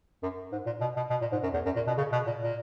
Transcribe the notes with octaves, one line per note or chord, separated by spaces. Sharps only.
F#2
G#2
A#2
B2
B2
B2
A#2
G#2
F#2
E2
F#2
A#2
B2
C#3
B2
A#2
A#2